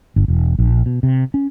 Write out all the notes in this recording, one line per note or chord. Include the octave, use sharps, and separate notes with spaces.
G1
E1
A#1
B2
C3
C#4